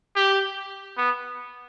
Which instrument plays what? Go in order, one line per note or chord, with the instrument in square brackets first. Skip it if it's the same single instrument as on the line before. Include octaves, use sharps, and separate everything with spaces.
[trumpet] G4
B3